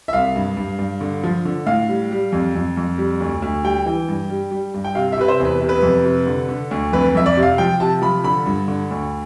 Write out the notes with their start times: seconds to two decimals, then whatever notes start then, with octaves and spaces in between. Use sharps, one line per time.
0.08 E5
0.13 C2 F5
0.36 G2
0.57 G2
0.79 G2
1.01 D3
1.24 F3
1.45 D3
1.66 A2 F5
1.89 G3
2.11 G3
2.32 F2
2.55 F2
2.77 F2
2.98 G3
3.20 D2
3.42 D2
3.64 G3 G5
3.86 E3
4.08 G2
4.30 G3
4.51 G3
4.74 G2
4.84 G5
4.95 C3 F5
5.12 E5
5.17 C3 B4
5.28 C5
5.40 E2
5.45 B4
5.61 C3
5.69 B4
5.83 F2
6.04 C3
6.27 D3
6.49 D3
6.71 D2
6.93 F2 B4
7.15 F2 E5
7.26 D5
7.37 C3
7.43 F5
7.58 F3 G5
7.80 C3 A5
8.02 F3 B5
8.24 D3 B5
8.46 G2
8.68 D3
8.90 D2